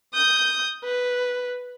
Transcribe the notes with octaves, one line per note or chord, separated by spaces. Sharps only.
D#6 G6
B4